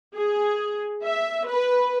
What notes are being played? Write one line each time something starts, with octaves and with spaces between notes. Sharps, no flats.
G#4
E5
B4